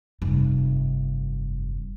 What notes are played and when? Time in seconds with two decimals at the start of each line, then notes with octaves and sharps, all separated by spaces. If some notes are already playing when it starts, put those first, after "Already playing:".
0.22 F1 G2